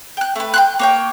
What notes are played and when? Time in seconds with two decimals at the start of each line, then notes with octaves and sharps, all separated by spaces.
0.17 G5 F#6
0.35 A3 B4
0.54 G5 C6 F#6
0.79 A#3 C#5 G5